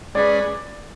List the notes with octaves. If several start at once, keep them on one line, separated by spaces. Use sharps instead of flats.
G#3 C#4 G#4 B4 D5